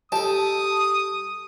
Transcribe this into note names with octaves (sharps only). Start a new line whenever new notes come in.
G4 A4 A5 D#6